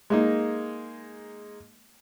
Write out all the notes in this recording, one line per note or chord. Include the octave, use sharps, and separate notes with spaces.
G#3 A#3 D#4